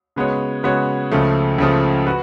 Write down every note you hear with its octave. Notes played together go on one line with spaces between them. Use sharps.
C#3 G#3 B3 F#4 C#5
C#3 G#3 B3 F#4 C#5
C#2 C#3 F3 A3
C#2 C#3 F3 A3
F#4 B4